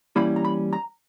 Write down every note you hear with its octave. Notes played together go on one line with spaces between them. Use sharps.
E3 G3 A#3 C#4 E4 B5
A#5
B5
A#5